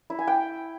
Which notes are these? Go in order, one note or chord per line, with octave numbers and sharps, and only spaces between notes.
E4
G#5
G5